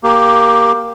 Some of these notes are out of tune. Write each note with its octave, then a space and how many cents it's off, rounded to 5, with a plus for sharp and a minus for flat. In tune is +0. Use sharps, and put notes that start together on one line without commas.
A#3 +0 G4 +5